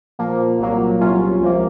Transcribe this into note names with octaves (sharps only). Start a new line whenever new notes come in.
A#2 F3 A#3
C2 A#2 F#3 A#3
C2 C3 F#3 C#4 F4
C#2 C3 F3 A#3